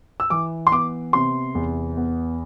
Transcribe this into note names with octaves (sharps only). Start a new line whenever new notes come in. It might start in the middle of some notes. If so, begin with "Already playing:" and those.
E6
E3 D6
C6
B3 D6
C3 C6
E2
B3